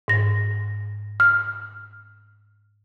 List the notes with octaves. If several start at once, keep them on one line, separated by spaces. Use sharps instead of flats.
G#2 A#6
F6